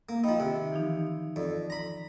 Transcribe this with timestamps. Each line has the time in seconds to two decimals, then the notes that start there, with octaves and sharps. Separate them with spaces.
0.09 A#3
0.24 F3 D#4 G5 B5
0.40 C3 D#3 D#4
0.72 E3 F3 D#4
1.36 F2 D5
1.70 A#5 B5